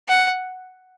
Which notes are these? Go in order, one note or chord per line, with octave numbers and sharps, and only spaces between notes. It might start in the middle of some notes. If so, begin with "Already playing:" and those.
F#5